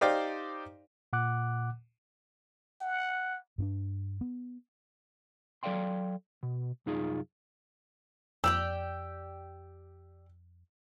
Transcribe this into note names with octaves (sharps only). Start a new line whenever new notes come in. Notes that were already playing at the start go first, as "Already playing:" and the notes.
D#4 G4 C5 D5 F5 G5
A#2 F#5 D6 F#6
F#5
G2 C#4 D4
B3
F#3 A4 D5 F5 G5 C6
B2
C2 F#2 D#4 F4 G#4
F2 G4 D5 G5 E6